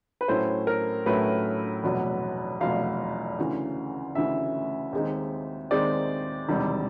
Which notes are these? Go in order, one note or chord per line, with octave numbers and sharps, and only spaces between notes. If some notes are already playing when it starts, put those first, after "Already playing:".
B4
A2 F#3 A3 C#4 E4 C5
A#4
A2 F#3 A3 C#4 E4 B4
F1 E2 B2 F#3
F1 E2 B2 F#3 F5
D2 C#3 E3
D2 C#3 E3 E5
D#2 D#3 G#3 C4 D#4
D#2 D#3 G#3 C4 D#4 D5
E1 E2 C3 D#3 G3